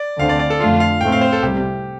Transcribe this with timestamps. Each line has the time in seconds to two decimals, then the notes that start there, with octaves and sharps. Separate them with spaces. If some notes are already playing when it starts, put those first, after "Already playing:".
Already playing: D5
0.19 D2 D3 A3 C4 F5
0.29 D5
0.39 D5
0.50 A4
0.60 F2 D3 A3 D4 F4 F5
0.80 F5
1.01 A2 A3 C4 G5
1.12 F5
1.21 C5
1.33 A4
1.42 C2 C3 G3 G4